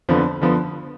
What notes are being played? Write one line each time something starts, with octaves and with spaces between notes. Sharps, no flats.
F2 D3 F3 B3
D3 F3 B3